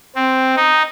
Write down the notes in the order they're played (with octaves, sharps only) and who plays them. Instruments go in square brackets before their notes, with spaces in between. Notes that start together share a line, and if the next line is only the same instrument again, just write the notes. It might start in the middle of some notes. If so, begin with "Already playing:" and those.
[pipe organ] C4
D#4